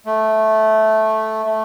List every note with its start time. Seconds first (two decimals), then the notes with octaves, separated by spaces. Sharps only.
0.06 A3
1.46 A3